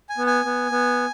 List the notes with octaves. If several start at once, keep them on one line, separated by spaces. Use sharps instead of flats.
G#5
B3
G#5
B3
B3